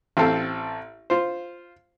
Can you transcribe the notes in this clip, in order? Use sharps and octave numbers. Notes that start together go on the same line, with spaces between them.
A1 C4 A4 F5
F4 C5